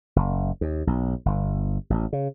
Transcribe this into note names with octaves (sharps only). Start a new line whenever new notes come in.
F#1
D#2
B1
G1
A1
C#3